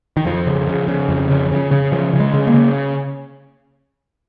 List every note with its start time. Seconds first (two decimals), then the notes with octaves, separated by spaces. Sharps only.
0.17 D#3
0.26 F2 F3
0.47 C#3
0.68 C#3
0.88 C#3
1.09 F2
1.30 C#3
1.51 C#3
1.71 C#3
1.92 C#3 F3
2.14 C#3
2.20 G#3
2.33 C#3
2.47 A#3
2.54 C#3